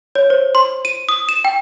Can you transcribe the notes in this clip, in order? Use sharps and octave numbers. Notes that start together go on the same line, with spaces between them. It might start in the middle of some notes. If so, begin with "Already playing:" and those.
C#5
C5
C6
D#7
D#6
E7
G5